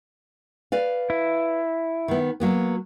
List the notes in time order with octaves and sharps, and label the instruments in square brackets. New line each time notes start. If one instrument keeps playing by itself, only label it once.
[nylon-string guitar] B4 D5 F5
[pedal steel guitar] E4
[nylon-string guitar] D#3 B3
F#3 A#3 B3